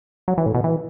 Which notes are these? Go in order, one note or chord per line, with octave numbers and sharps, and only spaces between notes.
F#3
E3
A2
B2
E3